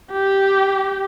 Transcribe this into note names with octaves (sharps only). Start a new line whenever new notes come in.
G4